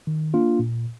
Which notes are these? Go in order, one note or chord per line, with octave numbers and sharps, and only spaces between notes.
D#3
A#3 D4 F4
A#2